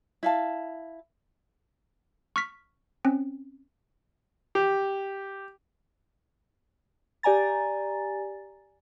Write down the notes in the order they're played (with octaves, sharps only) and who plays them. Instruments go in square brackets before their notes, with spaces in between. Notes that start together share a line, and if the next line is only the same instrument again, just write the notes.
[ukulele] E4 F5 A5
[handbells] C#6 F6 B6
C4 C#4
[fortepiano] G4
[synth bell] G4 D5 G#5 A#5 A6